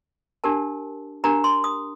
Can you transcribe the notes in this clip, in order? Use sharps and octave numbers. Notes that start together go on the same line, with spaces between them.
D4 G4 A#4 A5
D4 G4 A#4 A#5
C6
D#6